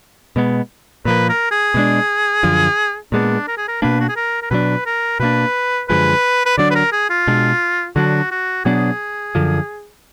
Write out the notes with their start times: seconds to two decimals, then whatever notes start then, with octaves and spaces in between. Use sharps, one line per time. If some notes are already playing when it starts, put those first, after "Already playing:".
0.36 B2 G#3 B3
1.05 A#2 F3 A#3 B4
1.29 A#4
1.51 G#4
1.74 B2 G#3 D4
2.43 F#2 D3 F3
3.12 A#2 G#3 B3 D4
3.48 A#4
3.57 G#4
3.68 A#4
3.82 B2 A#3 D4 B4
4.00 F#4
4.09 G#4
4.16 A#4
4.42 A#4
4.51 B2 F#3 D4 B4
4.86 A#4
5.20 B2 A#3 D4 B4
5.88 F#2 D3 F3 G#3 B4
6.45 B4
6.58 D3 F#3 D4 D5
6.71 B4
6.75 A#4
6.92 G#4
7.10 F4
7.27 B2 G#3 D4
7.96 D3 F#3 D4 F#4
8.31 F#4
8.65 B2 F#3 B3 D4 G#4
9.35 F#2 D3 F3